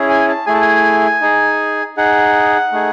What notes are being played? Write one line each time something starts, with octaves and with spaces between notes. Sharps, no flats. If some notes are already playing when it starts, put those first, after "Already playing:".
Already playing: C#4 E4 G#4
G#5
A5
A3 E4 G#4 G#5
A5
G#5
D#4 G#4
D#4 G#4 F#5
A3 D#4 G#4